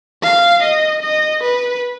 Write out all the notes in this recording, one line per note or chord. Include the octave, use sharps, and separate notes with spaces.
F5
D#5
D#5
B4